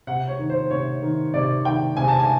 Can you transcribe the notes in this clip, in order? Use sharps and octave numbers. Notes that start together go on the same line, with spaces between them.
C3 F#5
C#5
D#3
C5
C3 C#5
D#3
C3 D5
D#3 G5
C3 G#5
A5
G#5